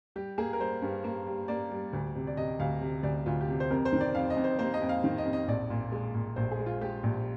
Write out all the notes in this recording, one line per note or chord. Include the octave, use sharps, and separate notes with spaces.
G3 G4
A#3 G#4
A#4
G3 C5
G2
A#3
G3
A#3 D5
G3
D2
C3
D5
C3 D#5
D2 F5
C3
D2 D5
D2 F4
G4
C3
C5
F2 A#4
C5
D#3
D5
F2 F5
D#5
F2
C5
A#3 C5
D#5
F2
F5
D#3 F5
D#5
F2
D#5
A#1 D5
A#2
G#3
A#2
A#1 C5
G#4
G#3
F4
G#3 G4
A#1